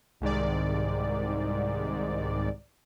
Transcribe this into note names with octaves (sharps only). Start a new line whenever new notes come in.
C2 G#2 D#3 D5